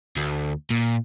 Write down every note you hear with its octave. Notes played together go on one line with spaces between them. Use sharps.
D2
A#2